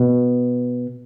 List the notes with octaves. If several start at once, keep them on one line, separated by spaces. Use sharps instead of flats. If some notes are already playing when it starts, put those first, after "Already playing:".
Already playing: B2